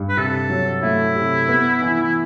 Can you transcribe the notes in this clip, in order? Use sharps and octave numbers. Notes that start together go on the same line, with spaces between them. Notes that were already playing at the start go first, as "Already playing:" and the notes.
Already playing: G2
B4
C3 A4
F#3
A3 E4
C3
B3
E3
E4